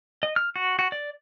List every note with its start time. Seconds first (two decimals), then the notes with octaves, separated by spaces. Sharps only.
0.23 D#5
0.36 F6
0.56 F#4
0.79 F#4
0.92 D5